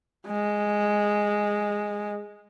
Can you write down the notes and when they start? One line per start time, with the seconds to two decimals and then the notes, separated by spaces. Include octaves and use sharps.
0.27 G#3